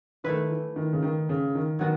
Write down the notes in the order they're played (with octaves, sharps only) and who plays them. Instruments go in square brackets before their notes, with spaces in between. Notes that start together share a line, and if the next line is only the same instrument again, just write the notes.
[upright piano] D#3 [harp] A3 E4 B4
[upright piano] E3
D#3
C#3
D#3
C#3
D#3
[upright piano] D#3 [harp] F#3 B3 F#4